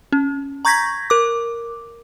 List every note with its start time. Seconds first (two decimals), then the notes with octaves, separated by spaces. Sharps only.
0.12 C#4
0.65 A#5 C#6 G6 G#6 A#6 B6
1.10 A#4 D6